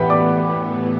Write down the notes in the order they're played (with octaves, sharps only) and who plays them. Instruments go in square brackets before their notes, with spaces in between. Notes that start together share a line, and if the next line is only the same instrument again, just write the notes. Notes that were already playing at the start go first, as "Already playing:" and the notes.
Already playing: [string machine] A2 E3 B3 [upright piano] G4 B4 F#5 G5 B5
[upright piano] D5 D6